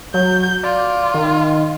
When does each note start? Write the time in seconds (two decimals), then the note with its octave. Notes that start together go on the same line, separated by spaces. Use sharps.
0.14 F#3 G6
0.63 F4 D5
1.14 D#3